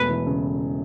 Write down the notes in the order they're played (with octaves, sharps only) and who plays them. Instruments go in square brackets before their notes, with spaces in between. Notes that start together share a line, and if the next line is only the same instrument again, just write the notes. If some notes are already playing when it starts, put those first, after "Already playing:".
Already playing: [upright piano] E1 A3 [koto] B4
[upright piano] E3
C#3